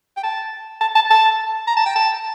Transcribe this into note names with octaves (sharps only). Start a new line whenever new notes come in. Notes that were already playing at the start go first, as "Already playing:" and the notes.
G5
A5
A5
A5
A5
A#5
A5
G5
A5